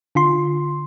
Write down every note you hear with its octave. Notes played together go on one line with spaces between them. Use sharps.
D3 F4 C6